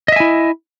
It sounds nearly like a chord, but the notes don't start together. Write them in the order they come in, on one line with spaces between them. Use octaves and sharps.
D#5 E5 G#5 E4